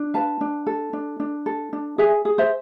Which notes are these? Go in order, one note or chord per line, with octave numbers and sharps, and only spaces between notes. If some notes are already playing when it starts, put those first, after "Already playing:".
Already playing: D4
B4 F5 A5
D4
A4
D4
D4
A4
D4
G#4 E5 G#5
G#4
C5 E5